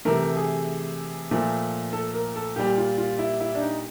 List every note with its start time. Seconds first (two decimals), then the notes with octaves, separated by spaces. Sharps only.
0.05 C3 E3 A3 A#4
0.37 G#4
1.31 A#2 F3 A3
1.93 A4
2.14 A#4
2.36 A4
2.56 A#2 G3 G4
2.78 F4
2.98 F4
3.19 E4
3.40 E4
3.55 D4
3.60 D#4